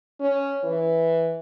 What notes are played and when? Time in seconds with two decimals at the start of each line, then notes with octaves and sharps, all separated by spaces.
0.20 C#4
0.64 E3